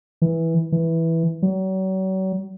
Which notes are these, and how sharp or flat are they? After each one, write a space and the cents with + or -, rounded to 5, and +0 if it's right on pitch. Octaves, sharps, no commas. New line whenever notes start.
E3 -10
E3 -5
F#3 +40